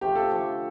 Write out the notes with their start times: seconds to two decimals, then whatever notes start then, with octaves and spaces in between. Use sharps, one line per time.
0.01 C3 F3 A3 G4
0.15 A4
0.30 D3 F3 A3 D4